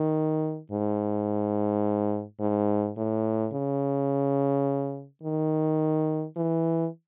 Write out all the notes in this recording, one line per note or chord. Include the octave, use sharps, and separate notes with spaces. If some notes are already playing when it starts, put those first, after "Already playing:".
Already playing: D#3
G#2
G#2
A2
C#3
D#3
E3